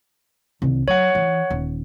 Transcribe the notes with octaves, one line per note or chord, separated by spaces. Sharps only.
C2 D#3
F#3 C#5 F#5
E3
D#1